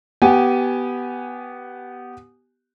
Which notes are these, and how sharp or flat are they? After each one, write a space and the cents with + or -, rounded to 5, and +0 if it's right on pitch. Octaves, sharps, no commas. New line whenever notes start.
B3 +0 G4 -20 G#5 +0